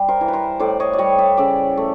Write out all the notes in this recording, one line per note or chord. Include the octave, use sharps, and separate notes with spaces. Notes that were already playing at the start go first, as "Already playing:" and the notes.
Already playing: G3
A#4 C5
E3
B4
A#4 C5
A2 C5 D5
C#5 D#5
D5
G3 C#5 D#5
D5 E5
C#3 D5 E5
A3